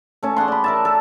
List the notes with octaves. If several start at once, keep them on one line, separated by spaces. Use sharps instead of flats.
A3 C#4 A5
G#4 D5 F#5 C6
D5 B5
A#4 E5 A5
A4